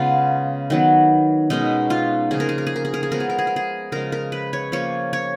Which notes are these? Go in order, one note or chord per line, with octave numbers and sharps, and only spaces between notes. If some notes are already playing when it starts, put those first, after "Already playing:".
Already playing: C#3 G#3 B3 F4
D#3 F#3 B3
B2 G#3 C#4 D#4
F4
C#3 F3 A#3 C#4 G#4
A#4
G#4
A#4
G#4
A#4
G#4
A#4
G#4
F3 G#3 B3 A#4
G#4
A#4
G#4
A#4
G#4
C#3 F3 G#3 A#4
A#4
B4
C#5
F3 A#3 C#4 C#5
C#5